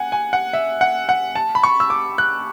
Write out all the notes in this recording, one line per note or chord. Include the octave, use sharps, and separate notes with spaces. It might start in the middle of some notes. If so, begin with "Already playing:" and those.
Already playing: F#5 G#5
G#5
F#5
E5
F#5
F#5
A5
B5
C#6
E6
D6
F#6